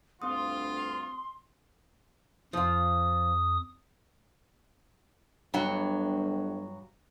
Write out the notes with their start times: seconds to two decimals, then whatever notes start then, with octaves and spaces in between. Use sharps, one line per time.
0.22 D2 G2 C4 F4 C6 D#6
2.53 F2 F3 F4 D#6
5.54 G1 G2 F#3 F#5